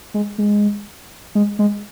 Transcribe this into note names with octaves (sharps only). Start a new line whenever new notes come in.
G#3
G#3
G#3
G#3